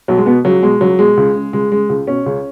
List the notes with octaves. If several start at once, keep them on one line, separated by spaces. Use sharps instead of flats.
B1 F#3
G#3
B2 B3
C#2 F#3
B2 G#3
C#2 F#3
B2 G#3
C#2
C#3
C#2 G#3
C#3 G#3
C#2
B2 C#4
C#2